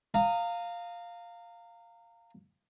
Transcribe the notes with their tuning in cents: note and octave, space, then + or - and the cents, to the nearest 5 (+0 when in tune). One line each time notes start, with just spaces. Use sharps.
F5 +0 A#5 -25 D#6 +0